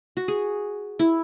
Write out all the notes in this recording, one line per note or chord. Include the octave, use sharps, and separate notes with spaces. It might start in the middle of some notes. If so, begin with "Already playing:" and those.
F#4
G#4
E4